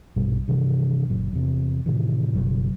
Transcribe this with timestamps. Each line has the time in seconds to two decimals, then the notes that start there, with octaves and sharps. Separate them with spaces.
0.16 A#1 G2 B2 G3
0.48 G2 C3 D#3 E3
1.09 F#1 A#2 F#3
1.33 E2 C3
1.86 A2 C3 D#3 E3
2.34 F#1 B2 F#3 G3